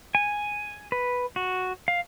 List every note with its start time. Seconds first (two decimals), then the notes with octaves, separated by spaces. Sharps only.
0.15 G#5
0.92 B4
1.36 F#4
1.88 F5